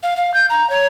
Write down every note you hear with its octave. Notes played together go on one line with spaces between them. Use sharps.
F5
F5
G6
A#5
C#5